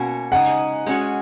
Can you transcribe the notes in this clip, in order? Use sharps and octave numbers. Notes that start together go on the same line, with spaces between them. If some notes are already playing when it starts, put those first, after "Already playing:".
Already playing: B2 A#3 C#4 F#4
C#3 G#3 D#4 F#5
G#3 C#4 F#4